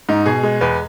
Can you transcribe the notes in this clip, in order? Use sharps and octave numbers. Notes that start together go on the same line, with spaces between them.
G#2 D#4
B2 G#4
G#3
E2 B4